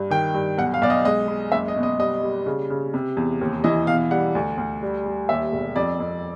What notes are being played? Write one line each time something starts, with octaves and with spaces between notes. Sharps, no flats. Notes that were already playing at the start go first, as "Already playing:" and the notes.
Already playing: G2
D#3 G5
G2
B1 F#5
F5
B1 D5
D#5
G#3 D#5
G#3
F#1 E5
D#5
B2
D#5
G3 D#5
G3
C#3
C#3
C3
E2
D#2
E3 D#5
B2 F5
G3 F#5
D2
D2
G3
G3
D#2 E5
E1
F2 D5
F2